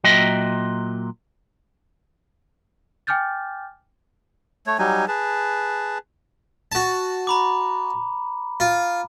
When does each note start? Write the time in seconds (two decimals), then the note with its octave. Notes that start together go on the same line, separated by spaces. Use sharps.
0.04 A#2 F#3 F#4 D#5 E5 G5
3.07 G5 G#5 D6 F6 G6 A6
4.67 A3 C#5
4.79 F#3 G3 D#4 G#5
5.08 G#4 B4 A5
6.72 F#4 A5
7.27 A#5 B5 D6
8.60 F4